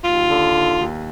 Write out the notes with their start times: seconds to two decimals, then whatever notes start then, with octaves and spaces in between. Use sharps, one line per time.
0.03 D#2 F4
0.28 D3
0.54 D#2
0.80 D#2